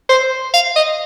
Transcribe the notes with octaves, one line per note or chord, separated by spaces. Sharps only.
C5
F5
D#5